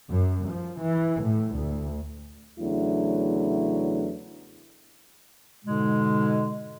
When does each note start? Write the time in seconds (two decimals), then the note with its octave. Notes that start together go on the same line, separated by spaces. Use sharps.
0.10 F#2
0.49 F3
0.82 E3
1.23 A2
1.56 D2
2.59 E2 C#3 F#3 A3 D4 E4
5.65 G#2 B2 D3 G#3